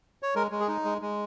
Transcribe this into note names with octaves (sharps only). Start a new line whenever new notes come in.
C#5
G#3 A#4
G#3
G#4
D#4
G#3
G#3